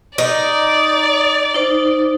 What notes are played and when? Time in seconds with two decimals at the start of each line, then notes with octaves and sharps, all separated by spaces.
0.18 D#4 D5
1.54 D#4 C5